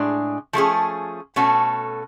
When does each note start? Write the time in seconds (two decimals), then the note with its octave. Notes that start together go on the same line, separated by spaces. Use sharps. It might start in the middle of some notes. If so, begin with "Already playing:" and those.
Already playing: A2 G#3 D4 G#4
0.53 F3 A3 C#4 G#4
1.36 B2 A3 C#4 F#4 A4